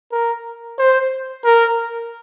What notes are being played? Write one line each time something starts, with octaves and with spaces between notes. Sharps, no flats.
A#4
C5
A#4